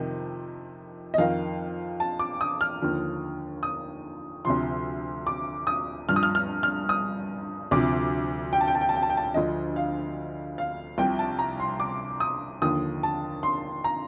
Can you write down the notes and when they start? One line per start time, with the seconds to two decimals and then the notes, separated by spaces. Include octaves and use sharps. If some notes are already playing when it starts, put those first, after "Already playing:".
Already playing: F2 C3 D#3
1.14 D#5
1.18 F2 D#3 F5
2.00 A5
2.19 D6
2.41 D#6
2.61 F6
2.82 D#2 D3 F3
3.63 D#6
4.45 D2 C3 F3 C6
5.27 D6
5.67 D#6
6.09 G2 F3 F6
6.16 D#6
6.23 F6
6.35 F6
6.63 F6
6.89 D#6
7.71 D2 C3 F3 D6
8.53 G5
8.61 A5
8.68 G5
8.75 A5
8.81 G5
8.89 A5
8.96 G5
9.02 A5
9.10 G5
9.17 A5
9.24 G5
9.34 D2 D3 F3 D#5
9.76 F5
10.58 F5
10.98 C2 C3 F3 G5
11.19 A5
11.39 A#5
11.60 C6
11.80 D6
12.20 D#6
12.62 D#2 D3 F3 D#6
13.03 A5
13.43 C6
13.84 A#5